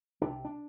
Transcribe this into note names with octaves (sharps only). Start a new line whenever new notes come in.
C2 C3 D4
D4